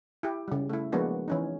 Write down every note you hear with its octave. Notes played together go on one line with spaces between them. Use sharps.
E4 G4
C#3 G3
A3 E4
F3 G#3 A#3 B3 D4 F#4
E3 C#4 D#4